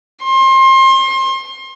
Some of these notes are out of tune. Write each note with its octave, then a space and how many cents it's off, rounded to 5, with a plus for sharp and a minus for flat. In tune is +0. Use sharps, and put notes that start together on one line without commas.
C6 +30